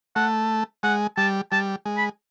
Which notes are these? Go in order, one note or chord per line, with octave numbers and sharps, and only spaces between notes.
A3 F#5
G#3 F#5
G3 A5
G3 A5
G#3
B5